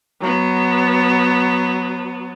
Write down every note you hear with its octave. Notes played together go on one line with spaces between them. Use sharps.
F#3 B3